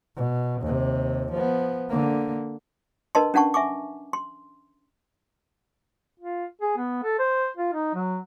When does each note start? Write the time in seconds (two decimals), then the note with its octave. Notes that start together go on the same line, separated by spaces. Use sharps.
0.16 B2
0.62 D#2 C3
1.32 F3 B3
1.89 D3 A#3
3.15 D4 A#4 B4 D#5 A5 C6
3.34 C#4 D4 F#5 A5 C#6
3.54 E5 G#5 C#6 D6
4.13 C6
6.19 F4
6.61 G#4
6.77 B3
7.04 A4
7.19 C5
7.57 F4
7.73 D#4
7.94 F#3